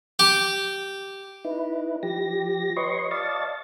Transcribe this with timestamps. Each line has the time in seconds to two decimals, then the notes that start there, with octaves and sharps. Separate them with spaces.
0.19 G4
1.45 D#4 E4 B4
2.03 F3 G4 A#6
2.77 B4 C#5 D#5 C6 C#6
3.11 D5 D#5 F5 A5 C#6 A6